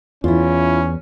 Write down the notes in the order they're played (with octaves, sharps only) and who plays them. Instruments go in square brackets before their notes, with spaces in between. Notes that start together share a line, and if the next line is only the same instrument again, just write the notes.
[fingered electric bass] E2 [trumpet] C#4 [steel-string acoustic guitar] E4 F4